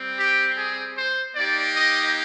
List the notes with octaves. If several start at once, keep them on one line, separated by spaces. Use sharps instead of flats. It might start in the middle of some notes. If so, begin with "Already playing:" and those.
Already playing: G3 C4
G4
G#4
C5
A#3 D#4 G4 D5
D#5